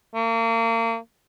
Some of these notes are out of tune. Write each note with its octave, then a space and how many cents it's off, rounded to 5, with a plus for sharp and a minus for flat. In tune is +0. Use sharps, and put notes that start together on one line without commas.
A#3 -35